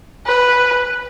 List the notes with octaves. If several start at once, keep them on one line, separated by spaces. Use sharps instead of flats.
B4